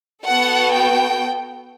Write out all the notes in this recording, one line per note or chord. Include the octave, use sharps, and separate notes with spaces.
B3 F#4 A4 F#5
G5